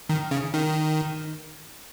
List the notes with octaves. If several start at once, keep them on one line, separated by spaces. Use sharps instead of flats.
D#3
C#3
D#3